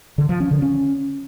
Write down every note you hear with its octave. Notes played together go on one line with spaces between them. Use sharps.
D3
F3
C#4
D3
C#4